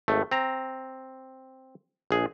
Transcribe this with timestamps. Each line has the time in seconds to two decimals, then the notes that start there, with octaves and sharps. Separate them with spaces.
0.08 G#1 A3
0.31 C4 A#5
2.11 A#1 G#4